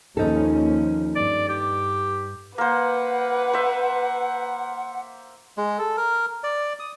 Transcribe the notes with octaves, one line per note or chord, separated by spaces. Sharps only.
D#2 F3 C#4 D#4 A4
G2 D5
G4
A#3 B4 C5 F#5
C5 E5
G#3
A4
A#4
D5
D#6